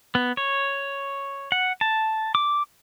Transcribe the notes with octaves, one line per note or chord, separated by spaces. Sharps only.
B3
C#5
F#5
A5
D6